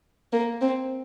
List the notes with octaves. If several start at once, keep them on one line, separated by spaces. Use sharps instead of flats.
A#3
C4